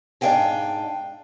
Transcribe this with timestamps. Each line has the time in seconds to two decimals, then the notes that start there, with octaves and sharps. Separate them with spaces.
0.21 G#2 D4 C#5 F5 G5 G#5